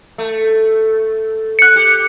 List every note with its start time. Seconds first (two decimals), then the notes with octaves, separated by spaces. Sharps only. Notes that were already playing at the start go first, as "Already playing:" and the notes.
0.18 A3
1.59 F#6 C#7
1.76 G4